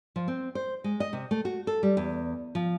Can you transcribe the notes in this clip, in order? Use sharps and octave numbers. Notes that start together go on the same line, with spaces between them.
F3
C4
C5
G#3
D#5
C3
A3
F#4
A4
G3
E2
F3